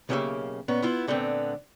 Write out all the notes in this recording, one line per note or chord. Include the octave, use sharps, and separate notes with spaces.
B1 C#3 A#3 C#4 G4 E5
A#2 B3 C#4
B3 E4 F4
A#2 D3 A3 B3 C4